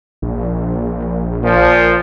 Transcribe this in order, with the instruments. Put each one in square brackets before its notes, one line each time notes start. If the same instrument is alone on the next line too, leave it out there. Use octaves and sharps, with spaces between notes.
[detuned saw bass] A#1
[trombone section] A#2 F3